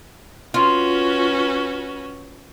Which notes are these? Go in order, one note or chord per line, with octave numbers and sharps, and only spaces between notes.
C#4 F4 F#4 B4